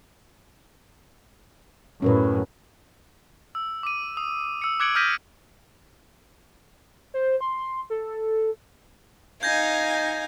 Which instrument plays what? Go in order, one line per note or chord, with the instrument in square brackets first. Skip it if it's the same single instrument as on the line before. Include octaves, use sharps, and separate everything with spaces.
[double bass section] F#2 A2 [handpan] C#4 A#4 B4
[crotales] E6
D6 D#7
D#6
E6 C#7
D6 F#6 G#6 C#7 D7 F#7
D#6 F6 G6 A#6 B6 D#7
[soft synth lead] C5
C6
A4
[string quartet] D#4 F5 G#5 [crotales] G6 G#6 A#6